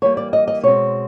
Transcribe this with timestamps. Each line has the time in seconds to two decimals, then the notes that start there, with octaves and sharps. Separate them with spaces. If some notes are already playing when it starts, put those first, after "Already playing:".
0.02 E3 G3 A#3 C#5
0.17 D5
0.33 D#5
0.48 D#5
0.63 B2 G#3 C4 C#5